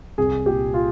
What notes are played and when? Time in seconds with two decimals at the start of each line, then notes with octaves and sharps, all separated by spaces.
0.18 C2 G#4
0.46 A#2 G4
0.74 F4